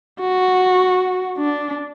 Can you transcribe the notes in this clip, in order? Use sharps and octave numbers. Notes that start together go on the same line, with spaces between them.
F#4
D4